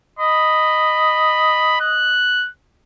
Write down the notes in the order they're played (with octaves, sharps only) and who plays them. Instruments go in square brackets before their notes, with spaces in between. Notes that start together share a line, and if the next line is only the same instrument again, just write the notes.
[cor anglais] D#5 [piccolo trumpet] B5
[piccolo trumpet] F#6